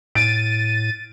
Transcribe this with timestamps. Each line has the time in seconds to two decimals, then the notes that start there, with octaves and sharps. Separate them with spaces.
0.15 A2 A6 D7 D#7